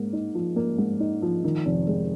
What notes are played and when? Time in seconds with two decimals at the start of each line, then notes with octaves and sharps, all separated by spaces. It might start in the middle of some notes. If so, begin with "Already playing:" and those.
Already playing: G#2 A#3
0.13 D#4
0.35 F3
0.56 A#3
0.78 G#2
1.00 D#4
1.22 F3
1.44 D#3
1.65 F1
1.87 G#3